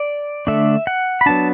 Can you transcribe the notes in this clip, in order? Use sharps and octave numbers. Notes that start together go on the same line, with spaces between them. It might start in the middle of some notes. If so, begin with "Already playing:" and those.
Already playing: D5
D3 A3 D4 E5
F#5
B5
F#3 B3 D4 A5